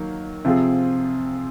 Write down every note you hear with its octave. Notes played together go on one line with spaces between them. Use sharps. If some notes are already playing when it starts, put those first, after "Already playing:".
Already playing: D#3 F#3 A#3
C3 F3 C4 F4 G#4